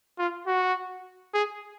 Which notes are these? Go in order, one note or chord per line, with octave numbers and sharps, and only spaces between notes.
F4
F#4
G#4